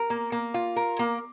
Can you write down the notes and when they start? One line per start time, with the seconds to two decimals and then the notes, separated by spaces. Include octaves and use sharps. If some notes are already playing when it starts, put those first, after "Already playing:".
Already playing: A#4
0.10 A#3
0.32 A#3
0.54 F4
0.76 A#4
0.99 A#3